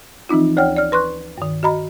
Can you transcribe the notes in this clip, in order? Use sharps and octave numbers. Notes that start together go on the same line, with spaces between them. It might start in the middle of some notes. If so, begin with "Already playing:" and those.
E3 F3 C4 D#4 F4
D2 C#5 F#5 G5 F6
D5 F6
B4 C6 C#6 F#6
G2 D#3
F#4 D#5 A#5 B5